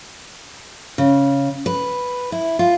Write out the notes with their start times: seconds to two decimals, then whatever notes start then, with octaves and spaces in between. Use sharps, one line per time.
0.98 C#3
1.66 B4
2.32 E4
2.59 F4